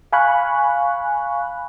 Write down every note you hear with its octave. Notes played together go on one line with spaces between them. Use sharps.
F5 G#5 B5 C#6 F#6